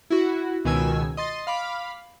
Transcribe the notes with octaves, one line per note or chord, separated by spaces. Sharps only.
E4 F#4
C#2 B2 D#3 G#5 E6
D#5 C6 A6
F5 B5 D6